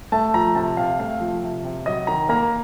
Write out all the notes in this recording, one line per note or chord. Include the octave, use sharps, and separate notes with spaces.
A3 A5
F3 A#5
C3 A5
C3 F5
A3 F5
F3
C3
C3
F#3 D#5
D#3 A#5
A#3 A#5